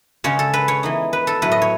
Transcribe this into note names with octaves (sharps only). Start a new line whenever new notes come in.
C#3 G#3 C#4 C#5
A4
B4
C#5
E3 B3 D#4
B4
A4
A2 F#3 A3 B4
D#5
C#5